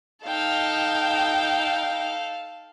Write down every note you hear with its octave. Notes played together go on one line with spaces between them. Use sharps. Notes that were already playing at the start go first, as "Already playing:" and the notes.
D#4 A4 F5 G5